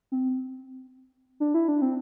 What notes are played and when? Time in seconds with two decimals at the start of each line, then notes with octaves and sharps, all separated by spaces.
0.12 C4
1.40 D4
1.54 E4
1.68 D4
1.82 C4